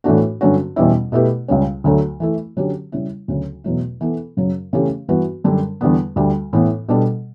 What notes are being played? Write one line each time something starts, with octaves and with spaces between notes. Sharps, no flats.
A2 E3 A3 D4 F#4
G2 D3 F#3 C#4 F#4
E2 B2 G3 C#4 E4
B2 A3 E4 G4 B4
C#2 C#3 G3 C#4
D2 D3 F#3 A3
E3 A3 E4
D3 F#3 C#4 G4
C#3 G3 C#4 E4
D2 C#3 F#3
E2 B2 F#3 A3 E4
E3 B3 E4 A4
F#2 C#3 F#3
C#3 E3 A3 C#4 G4
G2 E3 B3 F#4 B4
F#2 D3 G3 D4
E2 D3 G3 B3
D2 D3 G3
A2 E3 B3
B2 G3 D4 A4